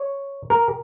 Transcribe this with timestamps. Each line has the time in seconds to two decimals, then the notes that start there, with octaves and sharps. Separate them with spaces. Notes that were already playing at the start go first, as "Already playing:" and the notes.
Already playing: C#5
0.50 A#4